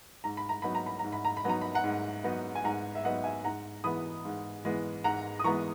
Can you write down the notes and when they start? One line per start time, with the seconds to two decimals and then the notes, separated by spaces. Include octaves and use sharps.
0.24 G#2 A#5
0.37 B5
0.49 A#5
0.62 F#3 B3 D#4 B5
0.75 A#5
0.86 B5
0.99 A#5
1.04 G#2
1.12 B5
1.25 A#5
1.37 B5
1.45 F#3 B3 D#4 A#5
1.61 B5
1.75 F#5 A#5
1.84 G#2
2.24 F#3 B3 D#4
2.55 G#5
2.64 G#2 F#5 A#5
2.95 E5
3.04 F#3 B3 D#4 D#5 F#5
3.24 E5 G#5
3.44 G#2 F#5 A#5
3.84 E3 G#3 B3 B5 D#6
4.25 G#2
4.65 E3 G#3 B3
5.04 G#2 F#5 A#5
5.39 D#6
5.44 E3 G#3 B3 A#5 C#6